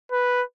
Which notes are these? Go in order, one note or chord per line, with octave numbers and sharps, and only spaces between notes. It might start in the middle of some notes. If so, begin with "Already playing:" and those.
B4